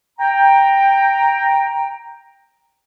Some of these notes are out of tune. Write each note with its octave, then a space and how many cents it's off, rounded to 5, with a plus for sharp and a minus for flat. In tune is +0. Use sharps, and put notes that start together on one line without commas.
G5 +10 A#5 +0